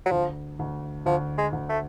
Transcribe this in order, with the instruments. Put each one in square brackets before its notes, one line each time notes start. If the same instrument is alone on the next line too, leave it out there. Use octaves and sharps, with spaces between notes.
[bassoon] F#3
[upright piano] D2 [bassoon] F3
[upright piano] D2
[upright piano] D2 [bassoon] F3
[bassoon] G#3
[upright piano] D2
[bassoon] A3